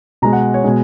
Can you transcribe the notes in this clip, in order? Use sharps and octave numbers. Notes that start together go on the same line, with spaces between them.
B2 G#3 A#5
F#5
C#5
B2 G#3